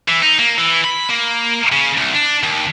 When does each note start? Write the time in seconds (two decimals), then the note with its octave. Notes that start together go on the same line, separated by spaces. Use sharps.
0.08 E3
0.23 D#4
0.39 A#3
0.58 E3
0.84 B5
1.09 A#3
1.72 C#3
1.97 C2
2.14 D4
2.43 D#2